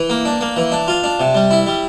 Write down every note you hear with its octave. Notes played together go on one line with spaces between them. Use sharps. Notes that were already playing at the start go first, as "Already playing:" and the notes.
Already playing: E3
A#3
D4
A#3
E3
D4
F4
D4
C3
G3
E4
G3